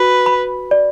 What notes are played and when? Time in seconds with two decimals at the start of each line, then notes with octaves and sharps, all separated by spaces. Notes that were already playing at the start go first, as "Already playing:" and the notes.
Already playing: F#4 B4
0.26 B5
0.71 D5